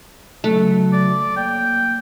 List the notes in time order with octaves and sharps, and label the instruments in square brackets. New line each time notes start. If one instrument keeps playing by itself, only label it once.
[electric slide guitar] C#3 F#3 [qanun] A3
[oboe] D5
[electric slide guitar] A#3 C#5 D5 [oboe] G5